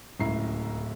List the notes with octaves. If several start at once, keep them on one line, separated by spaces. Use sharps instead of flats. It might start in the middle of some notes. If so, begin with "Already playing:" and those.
D1 C#2 E4 A#5 C7